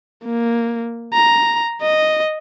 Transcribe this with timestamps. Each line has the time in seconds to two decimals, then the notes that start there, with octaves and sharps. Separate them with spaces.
0.25 A#3
1.14 A#5
1.82 D#5